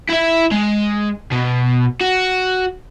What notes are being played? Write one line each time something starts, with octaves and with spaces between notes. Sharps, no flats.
E4 E5
G#3
B2
F#4